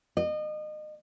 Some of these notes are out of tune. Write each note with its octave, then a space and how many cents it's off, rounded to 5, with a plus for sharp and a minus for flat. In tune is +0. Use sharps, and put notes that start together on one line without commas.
D#5 -30